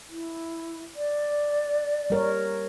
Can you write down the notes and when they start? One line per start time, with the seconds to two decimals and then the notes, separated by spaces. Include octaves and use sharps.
0.10 E4
0.96 D5
2.10 G3 A#4 C#5